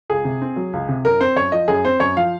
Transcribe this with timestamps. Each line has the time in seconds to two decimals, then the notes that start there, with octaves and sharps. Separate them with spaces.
0.09 C#2 G#4
0.25 C3
0.42 C4
0.56 F#3
0.73 C#2
0.89 C3
1.05 F#2 A#4
1.20 C4 C5
1.36 F#2 C#5
1.52 F3 D#5
1.68 F#2 G#4
1.85 C4 C5
2.00 F#2 C#5
2.17 F3 F5